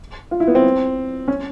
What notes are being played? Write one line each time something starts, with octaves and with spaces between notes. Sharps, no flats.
F4
E4
B3
C4
C#4